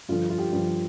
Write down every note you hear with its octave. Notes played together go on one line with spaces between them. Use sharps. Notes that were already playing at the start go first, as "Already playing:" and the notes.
G2 D3 F3 F4
F4
G4
G2 D3 F3 F4